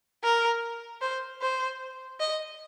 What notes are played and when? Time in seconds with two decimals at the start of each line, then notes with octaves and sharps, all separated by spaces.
0.23 A#4
1.01 C5
1.41 C5
2.20 D#5